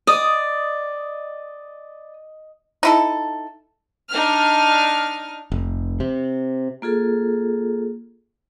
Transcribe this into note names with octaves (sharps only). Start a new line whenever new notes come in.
D5 D#5 D#6
D#4 E4 A4
D4 D#4 F6
F1
C3
A#3 F4 G#4 A4